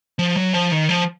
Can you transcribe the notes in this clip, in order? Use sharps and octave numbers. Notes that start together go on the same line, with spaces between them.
F3
F#3
F3
D#3
F3